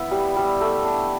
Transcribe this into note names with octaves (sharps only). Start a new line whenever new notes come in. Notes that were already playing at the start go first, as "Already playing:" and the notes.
Already playing: B3 E4
G3
G3
A3
D4